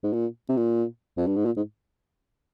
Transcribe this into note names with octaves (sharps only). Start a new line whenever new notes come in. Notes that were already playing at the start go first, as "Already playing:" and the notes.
G#2
A#2
C3
A#2
F2
G2
G#2
A#2
G#2